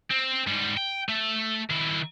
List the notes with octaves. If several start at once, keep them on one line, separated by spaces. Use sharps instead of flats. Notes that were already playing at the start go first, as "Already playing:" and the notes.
C4
G#2 G3
G5
A3
D#3 E4